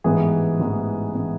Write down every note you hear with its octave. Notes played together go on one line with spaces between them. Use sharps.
A1 G#2 E3 B3 G#4
A1 G#2 E3 B3
E3 B3